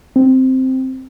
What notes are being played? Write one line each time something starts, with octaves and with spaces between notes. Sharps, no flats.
C4